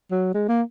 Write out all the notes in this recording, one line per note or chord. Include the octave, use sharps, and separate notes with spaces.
F#3
G#3
A#3